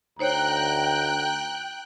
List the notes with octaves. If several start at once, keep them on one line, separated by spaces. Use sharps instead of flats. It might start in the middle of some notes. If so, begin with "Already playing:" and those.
D2 D#4 C5 C#5 G5 A#5 F#6